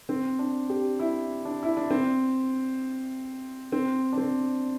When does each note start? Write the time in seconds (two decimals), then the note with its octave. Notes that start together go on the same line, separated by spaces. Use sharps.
0.09 C4
0.39 D4
0.70 G4
0.99 E4
1.45 D4
1.63 E4
1.77 D4
1.90 C4
3.72 C4
4.13 D4
4.17 C4